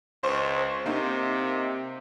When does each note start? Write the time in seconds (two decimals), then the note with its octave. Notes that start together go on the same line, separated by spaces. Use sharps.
0.23 C#2 C5 C#6
0.86 C3 A#3 D#4